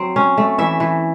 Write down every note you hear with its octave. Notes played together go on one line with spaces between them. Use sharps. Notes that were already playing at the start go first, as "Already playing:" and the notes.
Already playing: F#3 C4
C#4
A3
E3 E5
E3